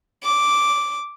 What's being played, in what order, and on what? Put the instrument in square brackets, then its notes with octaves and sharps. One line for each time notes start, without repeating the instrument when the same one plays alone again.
[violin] D6